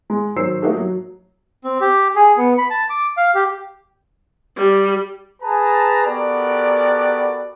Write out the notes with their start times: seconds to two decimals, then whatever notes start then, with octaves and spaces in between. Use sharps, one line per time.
0.10 G#3
0.36 D#3 F#3 C5 C#5 E6 C7
0.62 A3 A#3 D#4 F#4 G4 A4
0.77 F#3
1.64 C4
1.81 G4
2.16 G#4
2.37 B3
2.58 B5
2.70 A5
2.90 D6
3.17 F5
3.35 G4
4.57 G3
5.43 G#4 B4 A5 A#5
6.05 B3 F#4 G4 A4 A#4 D5